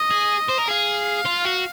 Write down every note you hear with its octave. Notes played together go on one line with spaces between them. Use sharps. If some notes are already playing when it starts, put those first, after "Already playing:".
Already playing: D#5
G#4
C5
A#4
G#4 F5
F4
F#4